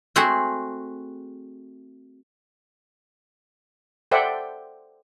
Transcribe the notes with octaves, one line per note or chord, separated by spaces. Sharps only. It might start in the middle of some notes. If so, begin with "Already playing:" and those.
A3 C4 F#4 G#4 E5 F#5
A4 C5 D5 E5 F#5 G5